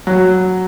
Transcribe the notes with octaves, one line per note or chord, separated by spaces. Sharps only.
F#3